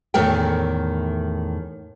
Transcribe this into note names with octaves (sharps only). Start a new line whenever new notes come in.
E2 A2 D#3 A3 A#4 G5